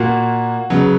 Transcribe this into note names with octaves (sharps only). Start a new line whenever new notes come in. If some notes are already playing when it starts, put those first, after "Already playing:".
Already playing: A#2 A#3 F#4
C#3 F#3 B3